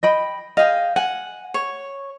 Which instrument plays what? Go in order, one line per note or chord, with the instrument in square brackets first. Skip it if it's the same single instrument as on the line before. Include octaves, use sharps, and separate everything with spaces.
[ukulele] D#5 G5 B5
[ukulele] G#4 D#5 [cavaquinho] F5 G5
[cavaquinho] F#5 [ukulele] G#5
[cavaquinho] C#5